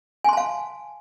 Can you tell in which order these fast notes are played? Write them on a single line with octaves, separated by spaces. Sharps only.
G#5 C6 A5 F5